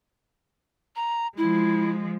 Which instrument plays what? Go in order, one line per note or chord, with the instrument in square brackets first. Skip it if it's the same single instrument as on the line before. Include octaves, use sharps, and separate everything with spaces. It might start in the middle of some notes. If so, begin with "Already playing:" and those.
[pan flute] A#5
[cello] F3 G#3 [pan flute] E4